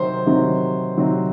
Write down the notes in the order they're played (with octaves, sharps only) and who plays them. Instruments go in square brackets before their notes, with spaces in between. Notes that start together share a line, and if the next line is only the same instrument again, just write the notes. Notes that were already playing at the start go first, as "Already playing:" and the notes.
Already playing: [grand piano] C3 D#3 F#3 C4 [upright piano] C5
[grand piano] C3 D#3 F#3 C4
C3 D#3 F#3 C4